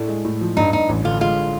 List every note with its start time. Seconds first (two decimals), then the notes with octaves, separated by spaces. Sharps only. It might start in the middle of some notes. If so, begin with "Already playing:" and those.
Already playing: A2 A3 D4
0.08 G#3
0.25 A2
0.41 F3
0.57 G2 D#4
0.73 G2 D#4
0.89 A1
1.05 D3 F4
1.21 G#3 F4